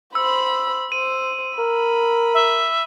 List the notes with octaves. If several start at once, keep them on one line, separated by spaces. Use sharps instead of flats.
C5 B5 E6
C5 D#7
A#4 B5
E5